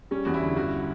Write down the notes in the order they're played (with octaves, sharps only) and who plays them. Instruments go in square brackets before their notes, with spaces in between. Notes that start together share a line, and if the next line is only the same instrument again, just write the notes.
[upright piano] G3 [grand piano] C#4
[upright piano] E2 [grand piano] F#4
[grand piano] E4
[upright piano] D3
[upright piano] G2 [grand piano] F#4